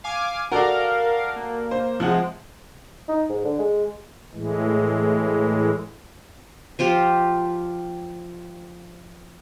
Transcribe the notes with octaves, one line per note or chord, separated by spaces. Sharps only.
F5 G#5 D6
F#4 A4 A#4 D5 F5
A#3
C5
C3 F3 G#3 F#5
D#4
G#2
D3
G#3
A2 E3 G#3
F3 F4 G4